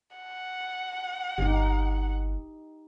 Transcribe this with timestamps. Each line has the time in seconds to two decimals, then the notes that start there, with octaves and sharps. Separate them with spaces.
0.17 F#5
1.38 G1 D#4 G4